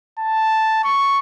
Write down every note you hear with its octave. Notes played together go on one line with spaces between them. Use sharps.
A5
C#6